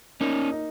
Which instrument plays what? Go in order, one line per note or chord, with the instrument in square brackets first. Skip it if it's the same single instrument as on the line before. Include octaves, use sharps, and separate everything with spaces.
[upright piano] A#3 [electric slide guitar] C#4 D#4
[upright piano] D#4